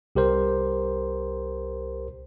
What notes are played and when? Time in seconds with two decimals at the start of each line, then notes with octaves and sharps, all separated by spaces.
0.15 C2 G4 A#4 C5